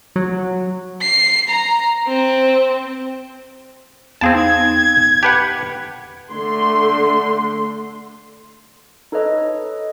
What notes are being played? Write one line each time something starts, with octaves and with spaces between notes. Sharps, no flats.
F#3
C7
A#5
C4
E2 B3 C4 G#4 F5 A5
D#4 G#6
G4 B4 F#5 A5
D3 A3 C6
D#4 A4 B4 C#5 D#5